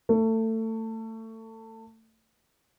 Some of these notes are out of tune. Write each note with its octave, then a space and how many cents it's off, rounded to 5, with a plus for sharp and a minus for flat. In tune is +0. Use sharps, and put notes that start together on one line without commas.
A3 +25